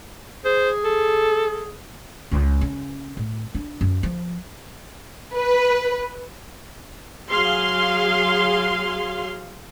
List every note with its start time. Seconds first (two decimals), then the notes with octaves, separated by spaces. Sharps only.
0.45 G#4 C5
0.84 A4
2.31 C#2
2.61 C#3
3.17 A2
3.55 D4
3.81 F#2
4.03 F3
5.35 B4
7.29 F#3 G#4 F5 C6